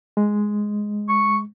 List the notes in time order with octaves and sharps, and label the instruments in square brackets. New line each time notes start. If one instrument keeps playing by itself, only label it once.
[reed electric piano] G#3
[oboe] C#6